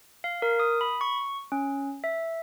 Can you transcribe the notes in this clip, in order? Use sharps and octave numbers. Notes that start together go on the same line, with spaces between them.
F5
A#4
D#6
B5
C#6
C#4
E5